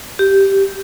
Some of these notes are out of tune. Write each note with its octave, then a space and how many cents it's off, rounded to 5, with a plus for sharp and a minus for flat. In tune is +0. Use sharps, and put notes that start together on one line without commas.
G4 -5